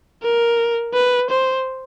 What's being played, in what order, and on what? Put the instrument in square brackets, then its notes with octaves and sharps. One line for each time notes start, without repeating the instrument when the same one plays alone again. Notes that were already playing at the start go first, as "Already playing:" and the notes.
[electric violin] A#4
B4
C5